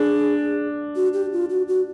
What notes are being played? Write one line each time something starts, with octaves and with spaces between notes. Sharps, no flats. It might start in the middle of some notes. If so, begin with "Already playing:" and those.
Already playing: D4 G#4
F#4
G4
F4
F#4
F#4